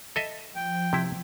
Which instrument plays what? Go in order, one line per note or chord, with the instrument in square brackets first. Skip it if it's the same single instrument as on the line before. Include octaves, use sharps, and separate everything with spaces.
[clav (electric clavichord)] A4 D#5 E5
[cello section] F3 [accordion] G5
[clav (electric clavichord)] C3 E4